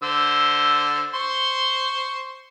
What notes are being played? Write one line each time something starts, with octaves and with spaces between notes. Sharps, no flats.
D3 C5 E6
C5 C6 C#6